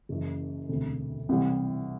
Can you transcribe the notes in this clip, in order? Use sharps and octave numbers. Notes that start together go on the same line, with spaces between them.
F#1 F#2 E3
E1 D2 C3
C2 C3 E3 G3